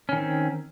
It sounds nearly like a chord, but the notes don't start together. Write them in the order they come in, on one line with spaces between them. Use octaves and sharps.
C#4 D#3 C4